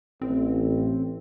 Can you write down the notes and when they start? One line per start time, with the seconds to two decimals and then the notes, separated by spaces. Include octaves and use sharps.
0.22 A1 C4